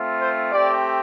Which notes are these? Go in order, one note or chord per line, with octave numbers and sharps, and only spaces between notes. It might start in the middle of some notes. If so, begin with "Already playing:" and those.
Already playing: A3 C4 F4
C5
A3 C4 G4 D5